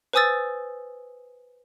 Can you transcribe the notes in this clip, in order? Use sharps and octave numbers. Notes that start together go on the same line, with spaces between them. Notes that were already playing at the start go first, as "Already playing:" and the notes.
B4 C5 G#5 D#6 E6 A6